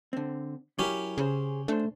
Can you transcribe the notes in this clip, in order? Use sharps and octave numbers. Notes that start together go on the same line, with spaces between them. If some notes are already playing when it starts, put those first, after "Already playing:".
D3 C4
F#3 C#4 E4 G4 A#4
C#3 G#4 C5
A3 D4 C5